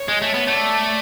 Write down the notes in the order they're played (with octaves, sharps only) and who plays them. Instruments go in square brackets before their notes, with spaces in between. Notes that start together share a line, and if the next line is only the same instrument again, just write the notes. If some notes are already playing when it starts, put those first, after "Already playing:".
Already playing: [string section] C#5
[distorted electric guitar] G#3
A3
B3
[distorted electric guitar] A3 [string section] D5